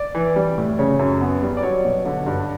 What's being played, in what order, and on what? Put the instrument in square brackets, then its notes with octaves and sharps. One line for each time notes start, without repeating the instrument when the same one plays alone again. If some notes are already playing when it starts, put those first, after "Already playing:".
Already playing: [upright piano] D5
E3
G3
A2
C#3 C#5
F#2
B3
G3
D5
F#3 C#5
B2
D3
G2